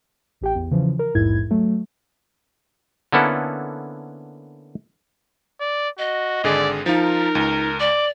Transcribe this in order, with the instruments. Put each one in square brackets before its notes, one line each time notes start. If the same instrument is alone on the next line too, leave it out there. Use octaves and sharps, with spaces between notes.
[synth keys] A1 G4 G5
E2
C#3 E3 F3
A#4
A#1 E2 G#2 E4 G#6
F#3 A3
[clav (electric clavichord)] D3 A#3 B3 C#4 E4 A4
[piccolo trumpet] D5
[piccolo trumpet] F#4 [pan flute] D#5
[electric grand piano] G#1 D3 G#4 [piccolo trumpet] D5
[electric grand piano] F3 F4 [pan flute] D#4 [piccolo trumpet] A#4
[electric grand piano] C#2
[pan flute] D5 [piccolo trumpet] D6